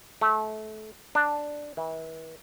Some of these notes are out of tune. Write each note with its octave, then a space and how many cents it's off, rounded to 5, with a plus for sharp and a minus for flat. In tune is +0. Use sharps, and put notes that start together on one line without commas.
A3 -25
D4 +5
E3 -35